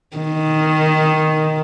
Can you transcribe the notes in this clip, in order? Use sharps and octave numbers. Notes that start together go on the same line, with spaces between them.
D#3